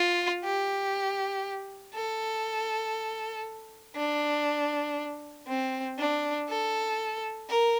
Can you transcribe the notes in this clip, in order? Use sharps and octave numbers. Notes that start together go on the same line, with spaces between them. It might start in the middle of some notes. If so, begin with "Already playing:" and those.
Already playing: F4
G4
A4
D4
C4
D4
A4
A#4